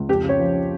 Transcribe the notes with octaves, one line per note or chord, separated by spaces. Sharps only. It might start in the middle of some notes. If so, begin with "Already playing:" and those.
Already playing: C#2
F2 G4
C#3
C#5
F3